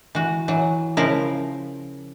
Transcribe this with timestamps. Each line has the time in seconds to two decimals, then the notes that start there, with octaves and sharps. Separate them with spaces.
0.15 E3 F#4
0.48 E3 F#3
0.97 C#3 F3 E4 A#4